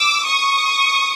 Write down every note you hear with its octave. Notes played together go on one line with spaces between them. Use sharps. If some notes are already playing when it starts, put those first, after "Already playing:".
Already playing: D6 E6
C#6 D#6